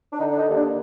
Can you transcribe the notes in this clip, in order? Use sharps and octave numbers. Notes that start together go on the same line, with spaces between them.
D4
D3 D#4
D4
D#4
D#2 D#4
D4